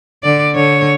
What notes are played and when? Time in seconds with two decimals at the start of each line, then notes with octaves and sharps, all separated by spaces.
0.24 D3 D5
0.55 D3 C#5